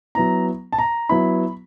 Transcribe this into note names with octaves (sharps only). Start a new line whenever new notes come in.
F#3 B3 E4 A#5
A5
A#5
F#3 B3 E4 B5